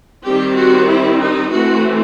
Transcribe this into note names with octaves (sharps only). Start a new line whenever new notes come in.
D#3 G3 C4 G4
F#4
E4
D#4
E3 A3 C4 F#4